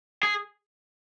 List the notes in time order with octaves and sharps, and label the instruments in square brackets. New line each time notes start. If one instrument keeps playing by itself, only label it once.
[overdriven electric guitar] G#4